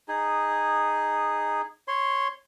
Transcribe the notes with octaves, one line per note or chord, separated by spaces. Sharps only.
D#4 G#4
C#5 C6